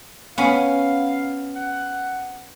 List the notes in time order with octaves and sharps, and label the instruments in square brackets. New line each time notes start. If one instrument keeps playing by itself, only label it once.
[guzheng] B3 C#4 [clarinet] F5
[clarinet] F#5